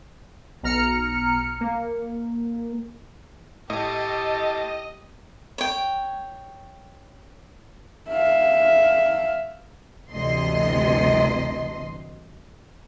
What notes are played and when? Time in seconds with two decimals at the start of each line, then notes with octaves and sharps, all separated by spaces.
0.63 B1 A#5 F6 C#7
1.61 A#3
3.70 A2 G4 A4 D#5
5.58 C#5 G5
8.10 E5 F5
10.11 G1 D2 C3 E3 D#5 C6